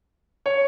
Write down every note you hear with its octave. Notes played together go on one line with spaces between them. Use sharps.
C#5